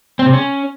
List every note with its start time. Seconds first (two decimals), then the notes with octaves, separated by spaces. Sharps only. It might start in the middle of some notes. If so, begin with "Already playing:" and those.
0.19 C4
0.26 C3
0.33 C#4